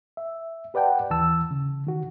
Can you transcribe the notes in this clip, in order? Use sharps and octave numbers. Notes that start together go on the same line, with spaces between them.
E5
G4 B4 D5 F#5 G5 A5
D#2 E3 A5 E6
C#3
D#3 F#4